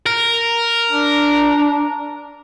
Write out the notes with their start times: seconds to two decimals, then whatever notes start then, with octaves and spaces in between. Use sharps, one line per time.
0.06 A#4
0.91 D4